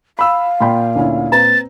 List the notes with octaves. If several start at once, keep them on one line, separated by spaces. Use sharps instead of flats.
F5 B5 E6
A#2 G5 B5 C6
D2 C#4 E4
C4 B4 A#5 A6